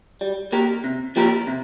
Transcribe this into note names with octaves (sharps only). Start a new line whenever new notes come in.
G3
A#3 G4 A#4
C3
F3 A#3 G4 A#4
C3